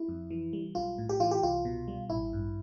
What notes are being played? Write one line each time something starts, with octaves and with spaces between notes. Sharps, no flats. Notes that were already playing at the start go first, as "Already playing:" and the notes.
Already playing: E4
F2
E3
G3
B1 F4
A2
G4
E3 F4
G4
C2 F4
B2
G3
A1 E4
G2